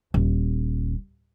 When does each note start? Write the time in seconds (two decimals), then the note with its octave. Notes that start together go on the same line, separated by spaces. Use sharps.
0.14 D#1